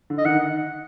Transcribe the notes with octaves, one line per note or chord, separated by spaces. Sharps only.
D3
D#5
D#3 F#5